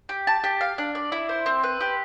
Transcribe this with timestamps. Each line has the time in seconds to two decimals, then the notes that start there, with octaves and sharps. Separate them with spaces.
0.09 G4
0.27 A5
0.44 G4
0.61 F5
0.78 D4
0.95 D5
1.12 E4
1.29 C5
1.46 C4
1.63 B4
1.80 G4